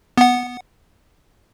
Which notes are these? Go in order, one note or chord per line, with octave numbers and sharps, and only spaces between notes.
B3 F#5